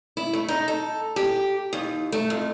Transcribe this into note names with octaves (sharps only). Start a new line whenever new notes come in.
E4
A3
D#4
A4
G4
D#2
A3
F2